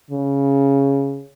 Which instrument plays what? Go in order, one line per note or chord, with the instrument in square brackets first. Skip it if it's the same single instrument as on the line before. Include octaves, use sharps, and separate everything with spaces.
[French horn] C#3